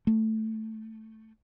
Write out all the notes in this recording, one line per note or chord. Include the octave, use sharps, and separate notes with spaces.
A3